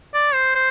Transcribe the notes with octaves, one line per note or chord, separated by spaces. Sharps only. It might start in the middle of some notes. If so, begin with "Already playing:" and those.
D5
C5
C5